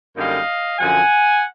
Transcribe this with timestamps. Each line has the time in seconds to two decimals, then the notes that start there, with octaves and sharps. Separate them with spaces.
0.17 F#2 D3 G3 A#3 D#4 D#5 F5
0.79 F#2 D3 F3 F#5 G#5